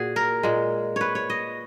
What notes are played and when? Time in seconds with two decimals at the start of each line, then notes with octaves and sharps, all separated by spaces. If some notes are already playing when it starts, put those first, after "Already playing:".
Already playing: A#2 F#4 G#4
0.16 A#4
0.43 A#2 G#3
0.96 B4 C#5
1.15 C#5
1.30 D#5